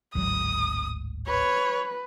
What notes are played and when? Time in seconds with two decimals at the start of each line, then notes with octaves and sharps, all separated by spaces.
0.15 D1 G#1 F#3 D#6
1.28 B4 C#5